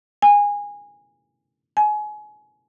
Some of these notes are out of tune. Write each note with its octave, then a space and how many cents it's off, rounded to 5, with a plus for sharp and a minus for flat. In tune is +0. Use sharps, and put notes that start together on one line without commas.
G#5 -20
G#5 +30